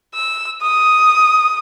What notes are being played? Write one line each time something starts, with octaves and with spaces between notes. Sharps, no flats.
E6
D#6